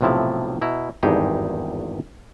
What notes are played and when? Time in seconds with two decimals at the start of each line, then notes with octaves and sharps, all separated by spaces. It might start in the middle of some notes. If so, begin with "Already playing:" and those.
0.01 B1 A2 C3 F3 E4 A5
0.61 B2 E4 A#5
1.03 G#1 E2 G2 D#4 G4 G#4